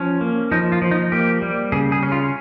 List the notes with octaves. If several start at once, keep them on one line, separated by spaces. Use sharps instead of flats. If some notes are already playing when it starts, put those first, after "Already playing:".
Already playing: F3 C#4
A#3
F3 D#4
F4
F3
D#4
A#3 G4
G3
C#3 G#4
G#4
C#4
F4